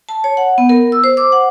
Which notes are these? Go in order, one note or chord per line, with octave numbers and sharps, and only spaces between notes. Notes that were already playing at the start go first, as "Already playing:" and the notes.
A5
C#5
F#5
B3
A#4
E6
C5
D6
F#5